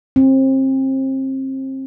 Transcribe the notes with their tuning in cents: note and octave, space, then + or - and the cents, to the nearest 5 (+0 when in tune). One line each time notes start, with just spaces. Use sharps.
C4 +30